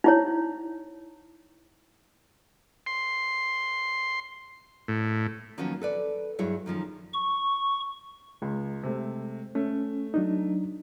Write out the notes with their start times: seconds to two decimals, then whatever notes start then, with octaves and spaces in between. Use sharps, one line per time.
0.04 D#4 E4 C#5
2.86 C6
4.88 A2
5.58 D#3 F3 F#3 A#3 B3 C#4
5.82 A4 B4 D5
6.39 G2 F#3 E4 G#4 C#5
6.66 F#2 D#3 F3 C#4
7.14 C#6
8.42 C#2 G#3
8.83 C3 A3
9.55 A3 C#4
10.14 F#3 D4 D#4